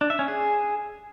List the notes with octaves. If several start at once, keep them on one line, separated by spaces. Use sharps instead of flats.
D4
E5
C#4
G#4